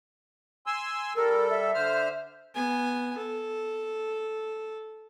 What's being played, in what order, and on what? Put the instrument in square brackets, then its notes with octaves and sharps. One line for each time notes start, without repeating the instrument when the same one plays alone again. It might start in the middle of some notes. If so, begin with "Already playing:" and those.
[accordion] G#5 C6 E6
[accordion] G3 A4 [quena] A#4
[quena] E5
[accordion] D3 C5 F6
[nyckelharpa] B3 G#5
A4